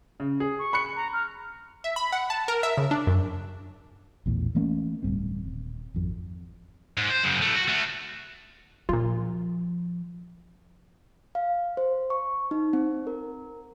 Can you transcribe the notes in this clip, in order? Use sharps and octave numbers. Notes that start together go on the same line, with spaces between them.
C#3
G#4
C#6
B5 F#6 C#7
A#5
F6
E5
B5
F#5
A5
A#4
E5
C#3
D4
F#2
A#1 E2 A2
E3 A3 A#3 C#4
D1 G#1 G2 C4
D#1
G#1 F2
G#2
C5
F#2 C#3
E3 A3
F#4
A3 F#4
A#2 F3 F4
F5
C5
C#6
D#4
C4
A#4